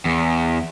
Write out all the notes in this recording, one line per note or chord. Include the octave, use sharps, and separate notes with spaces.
E2